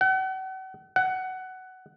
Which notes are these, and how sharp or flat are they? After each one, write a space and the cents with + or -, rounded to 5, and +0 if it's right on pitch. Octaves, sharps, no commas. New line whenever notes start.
F#5 +40
F#5 +15